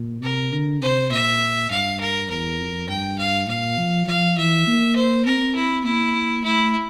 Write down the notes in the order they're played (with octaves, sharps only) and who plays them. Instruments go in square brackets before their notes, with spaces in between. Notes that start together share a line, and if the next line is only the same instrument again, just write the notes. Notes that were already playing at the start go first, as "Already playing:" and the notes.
Already playing: [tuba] A#2
[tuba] C3 [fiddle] A#4
[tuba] D3
[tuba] C3 [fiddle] C5
[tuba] A#2 [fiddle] E5
[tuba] G2 [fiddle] F5
[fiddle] A#4
[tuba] E2 [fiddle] A#4
[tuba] F2
[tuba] G2 [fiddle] G5
[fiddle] F5
[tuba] A#2 [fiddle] F5
[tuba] F3
[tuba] F3 [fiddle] F5
[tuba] E3 [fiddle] E5
[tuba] A#3
[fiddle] C5
[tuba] C4 [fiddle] A#4
[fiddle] E4
[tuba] A#3 [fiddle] E4
[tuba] A3 [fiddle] E4